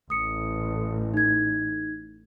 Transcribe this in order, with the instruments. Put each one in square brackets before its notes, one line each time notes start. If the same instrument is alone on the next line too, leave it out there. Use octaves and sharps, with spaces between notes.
[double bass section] A1 [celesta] D#6 C#7
[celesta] D#4 G#6